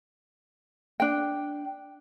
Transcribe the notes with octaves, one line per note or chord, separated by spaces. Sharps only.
D4 G5